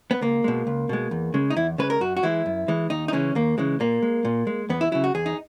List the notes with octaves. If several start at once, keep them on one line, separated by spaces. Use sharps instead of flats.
B3
C#2 A#3
B2 G#3
C#2
B2 G#3
E2
C#3 G#3
D#4
E2 E4
C#3 G#3 B4
A#4
F#2 F#4
F#4
E3 G#3 E4
F#2
E3 G#3
D#2 D#4
D#4
C#3 E3 G#3 C#4
D#2 A#3
C#3 E3 G#3
A#2 A#3
G#3
A#2
G#3
E2 B3
E4
C#3 F#3 E4
F#4
E2 G#4
D#4